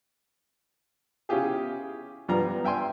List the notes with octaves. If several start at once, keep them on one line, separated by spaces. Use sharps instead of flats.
C#4 E4 F4 G4 G#4
G2 F3 G3 B3 A#5
E5 G5 G#5 C6